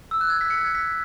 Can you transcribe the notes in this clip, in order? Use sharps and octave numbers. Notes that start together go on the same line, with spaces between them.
E6
F#6
G#6
B6
C#7
G#6
B6